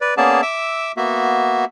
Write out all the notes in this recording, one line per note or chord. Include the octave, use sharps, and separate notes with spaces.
B4 D5
A#3 B3 C#4 G#4 D5 A5
E5 D6 E6
A#3 B3 F#4 E5